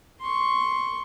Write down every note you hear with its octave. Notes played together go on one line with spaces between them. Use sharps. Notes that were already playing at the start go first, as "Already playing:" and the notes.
C6 C#6